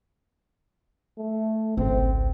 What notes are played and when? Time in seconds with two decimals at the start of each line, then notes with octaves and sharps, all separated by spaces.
1.18 A3
1.77 G#1 C#2 C4